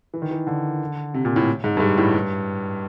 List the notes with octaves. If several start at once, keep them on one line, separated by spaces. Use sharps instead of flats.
E3
D#3
E3
D3
C3
A#2
A2
G#2
G2
G#2
A2
G2